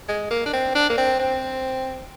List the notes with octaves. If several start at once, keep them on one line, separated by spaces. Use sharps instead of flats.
G#3
A#3
D4
C4
D4
A#3
C4
C4